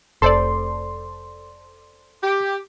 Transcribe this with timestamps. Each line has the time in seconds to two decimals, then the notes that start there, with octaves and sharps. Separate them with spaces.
0.22 F1 A4 C5 D5 C6
2.23 G4